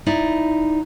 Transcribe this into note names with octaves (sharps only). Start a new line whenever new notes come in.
D#4 E4 D5